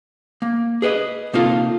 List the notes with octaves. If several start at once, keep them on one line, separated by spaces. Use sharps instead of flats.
A#3
G#4 B4 C#5 D#5
C3 A#3 D#4 F4 A4